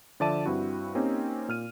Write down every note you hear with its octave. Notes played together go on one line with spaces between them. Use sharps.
D3 F3 D5 E5 A5 D#7
G2 C4 E4 F#4
A#3 C4 C#4 D#4 G4
A#2 F6 D#7